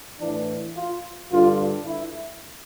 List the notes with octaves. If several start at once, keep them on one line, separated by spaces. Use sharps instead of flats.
A2 E3 D4
F4
G2 D3 F4
E4